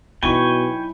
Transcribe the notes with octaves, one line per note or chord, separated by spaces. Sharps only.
B2 F#3 D#4 E4 G5 G#5 B5 C#6